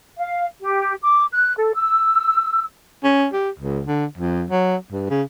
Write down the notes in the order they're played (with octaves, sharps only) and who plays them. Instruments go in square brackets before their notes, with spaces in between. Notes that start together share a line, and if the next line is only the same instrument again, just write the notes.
[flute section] F5
G4
D6
F#6
A4
E6
[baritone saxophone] C#4
G4
C#2
D3
F2
F#3
G2
C#3